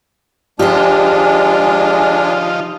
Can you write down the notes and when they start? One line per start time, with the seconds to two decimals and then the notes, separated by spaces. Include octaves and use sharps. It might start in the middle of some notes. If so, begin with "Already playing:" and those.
0.59 F3 G#3 D4 D#4 F4 G4 C5